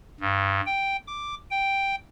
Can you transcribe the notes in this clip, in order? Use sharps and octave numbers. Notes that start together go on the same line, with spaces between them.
G2
G5
D6
G5